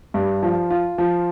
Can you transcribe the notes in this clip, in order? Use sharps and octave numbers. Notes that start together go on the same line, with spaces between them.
G2
F3
F4
F3